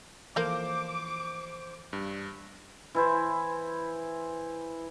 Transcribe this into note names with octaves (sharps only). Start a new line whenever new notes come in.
E3 F3 A#3 A4 C5 F5 D6 G6
G2
E3 E4 C5